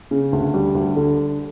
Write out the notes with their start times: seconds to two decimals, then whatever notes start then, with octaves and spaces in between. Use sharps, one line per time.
0.11 C#3
0.33 D2
0.54 G3
0.75 D2
0.96 D3